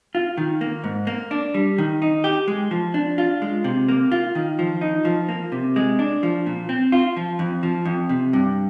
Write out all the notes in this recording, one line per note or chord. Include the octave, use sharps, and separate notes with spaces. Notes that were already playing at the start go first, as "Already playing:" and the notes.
F4
D#3
A#3
G#2
A#3
D4
G3
D#3
D#4
G4
G#3
F3
D4
F4
G#3
C3
A#3
F4
D#3
F3
D#4
F3
A#3
C3
G#3
D4
F3
A#2
C4
F4
F3
F2
F3
F2
C3
G2